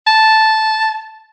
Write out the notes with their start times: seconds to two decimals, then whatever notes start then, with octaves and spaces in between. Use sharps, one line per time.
0.07 A5